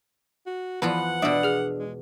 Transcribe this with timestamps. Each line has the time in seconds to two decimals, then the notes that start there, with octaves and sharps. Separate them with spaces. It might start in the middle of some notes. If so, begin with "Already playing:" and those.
0.46 F#4
0.82 E2 F3 F4 B4 F#5
0.98 F#6
1.22 B2 D4 D5 E5 D#6
1.43 G#4 F6
1.78 G#3